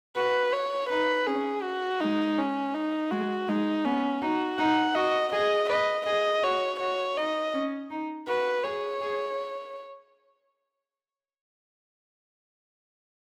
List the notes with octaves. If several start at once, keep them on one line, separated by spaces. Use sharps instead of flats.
F#4 B4
C#5
D#4 B4
C#4 G#4
F#4
G#3 D#4
C#4
D#4
G#3 F#4
G#3 D#4
B3 C#4
D#4 F#4
D#4 F#5
F#4 D#5
G#4 D#5
B4 D#5
G#4 D#5
F#4 C#5
F#4 C#5
D#4 D#5
C#4
D#4
F#4 B4
G#4 C#5
G#4